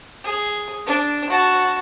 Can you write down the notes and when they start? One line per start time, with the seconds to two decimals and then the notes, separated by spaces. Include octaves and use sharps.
0.25 G#4
0.87 D4
1.30 F#4 A5